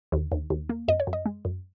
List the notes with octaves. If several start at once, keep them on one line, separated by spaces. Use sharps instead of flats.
D#2
D#2
D#2
A#3
F#2 D#5
C#5
F#2
D#5
G#3
F#2